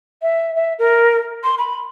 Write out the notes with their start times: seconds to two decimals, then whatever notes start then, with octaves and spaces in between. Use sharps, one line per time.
0.22 E5
0.55 E5
0.79 A#4
1.44 C6
1.58 B5